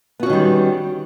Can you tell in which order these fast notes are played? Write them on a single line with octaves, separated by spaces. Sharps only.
B3 F#4 C#4 D#3 G3